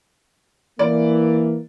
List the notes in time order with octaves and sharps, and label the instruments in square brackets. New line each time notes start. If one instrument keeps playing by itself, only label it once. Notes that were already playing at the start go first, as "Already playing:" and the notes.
[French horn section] E3 A#3 [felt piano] D5